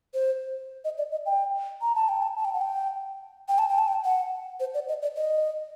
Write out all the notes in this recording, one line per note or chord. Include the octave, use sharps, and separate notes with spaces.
C5
D#5
D5
D#5
G5
A#5
A5
G5
A5
A5
G5
F#5
G5
G5
A5
G5
A5
G5
F#5
C5
D5
D#5
D5
D#5